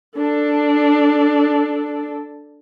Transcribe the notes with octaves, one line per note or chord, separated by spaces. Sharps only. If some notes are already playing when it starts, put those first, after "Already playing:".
D4 A4